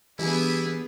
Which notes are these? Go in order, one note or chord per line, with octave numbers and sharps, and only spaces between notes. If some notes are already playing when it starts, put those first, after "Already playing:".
E3 G3 B3 D4 E4 G#4 G#5